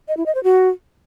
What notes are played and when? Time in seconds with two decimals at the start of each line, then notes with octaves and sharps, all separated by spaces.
0.08 D#5
0.17 E4
0.26 D#5
0.35 C5
0.44 F#4